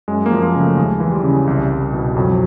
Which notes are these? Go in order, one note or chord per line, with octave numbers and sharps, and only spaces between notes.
F#2 G#3
A#3
F3
A#3
C#3
A3
D#2 G#3
E3
G3
C#3
C2
C2
B2
F2 F#3